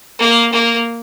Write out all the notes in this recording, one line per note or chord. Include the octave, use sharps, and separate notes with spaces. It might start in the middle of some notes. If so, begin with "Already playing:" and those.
A#3
A#3